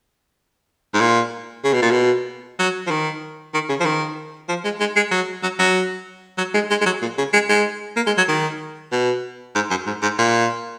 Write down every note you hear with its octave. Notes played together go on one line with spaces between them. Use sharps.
G#2
A#2
C#3
B2
A#2
B2
F#3
F3
D#3
D#3
C#3
F3
D#3
F3
G#3
G#3
G#3
F#3
F#3
F#3
F#3
G#3
G#3
G#3
F#3
A#2
C#3
G#3
G#3
A#3
G#3
F#3
D#3
B2
G#2
F#2
G#2
G#2
A#2